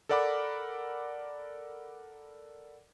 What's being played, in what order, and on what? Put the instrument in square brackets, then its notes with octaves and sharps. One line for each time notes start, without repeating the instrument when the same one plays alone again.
[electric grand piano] A4 A#4 D5 F#5 B5 D6